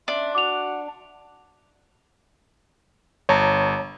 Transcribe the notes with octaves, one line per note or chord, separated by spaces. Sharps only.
C#4 D4 E5 C6
F#4 F#5 D6 F7
G1 C#5 A5 A#5